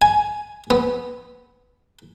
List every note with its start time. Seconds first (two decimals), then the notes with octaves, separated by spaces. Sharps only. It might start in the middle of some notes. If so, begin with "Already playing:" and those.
0.02 G#5
0.70 B3